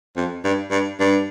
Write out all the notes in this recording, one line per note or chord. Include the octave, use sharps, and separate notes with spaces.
F2
G2
G2
G2